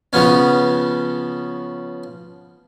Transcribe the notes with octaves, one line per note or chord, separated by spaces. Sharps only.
C#3 F3 B3 C#4